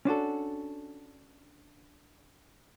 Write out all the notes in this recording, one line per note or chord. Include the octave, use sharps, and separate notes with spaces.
C#4 D4 F#4 A4